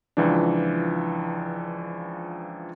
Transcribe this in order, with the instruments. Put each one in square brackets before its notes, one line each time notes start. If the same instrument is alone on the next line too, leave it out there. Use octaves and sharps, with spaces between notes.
[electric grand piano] C#2 E3 F3 D4